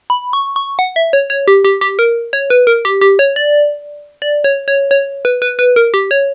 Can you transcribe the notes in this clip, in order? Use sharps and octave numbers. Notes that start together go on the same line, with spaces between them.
B5
C#6
C#6
F#5
E5
C#5
C#5
G4
G4
G4
A#4
C#5
B4
A#4
G4
G4
C#5
D5
D5
C#5
C#5
C#5
B4
B4
B4
A#4
G4
C#5